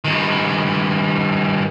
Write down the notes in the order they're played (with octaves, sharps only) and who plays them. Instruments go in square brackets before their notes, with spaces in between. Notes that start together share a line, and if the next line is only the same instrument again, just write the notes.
[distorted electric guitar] G2 D#3